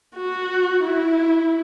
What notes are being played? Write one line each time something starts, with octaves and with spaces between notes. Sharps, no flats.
F#4
E4